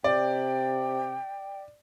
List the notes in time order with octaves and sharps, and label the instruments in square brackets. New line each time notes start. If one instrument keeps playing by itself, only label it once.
[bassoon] C3 [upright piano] D5 [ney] G5